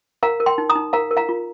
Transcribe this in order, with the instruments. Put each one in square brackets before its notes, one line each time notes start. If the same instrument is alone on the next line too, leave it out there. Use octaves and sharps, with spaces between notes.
[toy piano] A#4 F5 A#5
A#4
G5 C6
D#4
A#5 D#6
D#4
A#4 F5 A#5
A#4
F5 A#5
F4